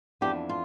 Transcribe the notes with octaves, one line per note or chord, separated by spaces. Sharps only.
F2 E3 B3 D4 G4
F4